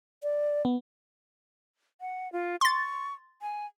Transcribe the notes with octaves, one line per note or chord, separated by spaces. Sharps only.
D5
B3
F#5
F4
C6 C#6 A6
G#5